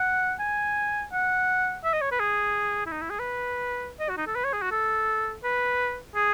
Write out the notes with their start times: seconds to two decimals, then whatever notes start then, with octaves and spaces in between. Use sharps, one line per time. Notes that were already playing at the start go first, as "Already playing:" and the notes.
Already playing: F#5
0.40 G#5
1.13 F#5
1.85 E5
1.94 D#5
2.01 C#5
2.12 B4
2.20 G#4
2.86 E4
2.92 D#4
3.02 E4
3.10 G#4
3.19 B4
4.00 D#5
4.09 F#4
4.17 D#4
4.27 A4
4.35 B4
4.44 C#5
4.53 G#4
4.62 F#4
4.71 A4
5.44 B4
6.15 G#4